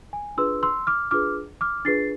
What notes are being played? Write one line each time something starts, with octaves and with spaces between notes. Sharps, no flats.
G#5
D4 F4 G#4 B4 C6 E6
C6 E6
D6 F6
D4 F4 G#4 B4 D6 F6
D6 F6
D4 F4 G#4 B4 A6 C7